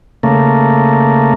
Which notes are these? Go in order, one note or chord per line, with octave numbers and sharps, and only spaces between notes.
C#3 A3 A#3